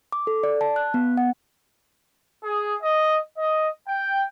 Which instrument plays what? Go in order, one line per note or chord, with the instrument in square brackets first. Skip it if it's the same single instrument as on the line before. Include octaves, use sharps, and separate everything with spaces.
[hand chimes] D6
A4
D5
A5
F#6
B3
F#5
[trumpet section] G#4
D#5
D#5
G5